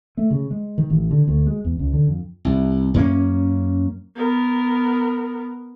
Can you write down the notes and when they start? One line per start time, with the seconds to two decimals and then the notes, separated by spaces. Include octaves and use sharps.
0.17 A3
0.31 C#3
0.51 G#3
0.78 D#3
0.90 A1
1.11 D3
1.28 D2
1.47 G#3
1.65 E2
1.79 C#2
1.93 D3
2.07 F2
2.45 C2
2.94 F#2 A#3 C#4
4.16 B3 A#4